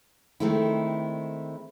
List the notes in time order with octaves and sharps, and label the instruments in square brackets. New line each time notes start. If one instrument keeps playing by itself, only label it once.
[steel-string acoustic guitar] D#3 G#3 A3 C4 E4